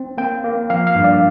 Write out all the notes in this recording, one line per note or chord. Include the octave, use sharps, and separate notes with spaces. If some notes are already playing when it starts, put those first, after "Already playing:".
Already playing: C4
A#3 G5
A#3
F3 F5
F5
G2
D5